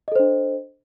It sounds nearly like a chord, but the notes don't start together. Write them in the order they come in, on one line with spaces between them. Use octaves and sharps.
D#5 A4 C5 D4